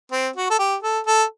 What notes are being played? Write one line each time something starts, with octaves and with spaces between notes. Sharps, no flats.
C4
F#4
A4
G4
A4
A4